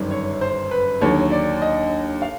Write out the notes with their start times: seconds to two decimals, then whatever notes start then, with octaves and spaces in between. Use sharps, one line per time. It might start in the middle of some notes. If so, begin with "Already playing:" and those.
Already playing: G1 F#2 D#3 G3
0.11 C#5
0.41 C5
0.71 B4
1.01 D#2 D3 F#3 C#5
1.32 D5
1.62 D#5
2.22 F5